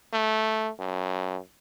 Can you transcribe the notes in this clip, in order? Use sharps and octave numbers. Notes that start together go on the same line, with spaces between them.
A3
F#2